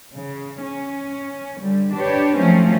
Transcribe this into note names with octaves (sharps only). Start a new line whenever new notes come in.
C#3
C#4
D3 G3
D4 G4 B4 C#5
D#3 F3 F#3 A3 C4 C#4